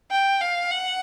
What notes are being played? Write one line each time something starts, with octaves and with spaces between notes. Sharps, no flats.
G5
F5
F#5